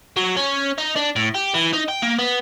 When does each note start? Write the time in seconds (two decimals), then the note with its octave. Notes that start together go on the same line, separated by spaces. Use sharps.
0.16 F#3
0.36 C#4
0.78 D#4
0.96 D4
1.16 A2
1.35 G4
1.55 E3
1.73 D#4
1.89 G5
2.02 A#3
2.18 B3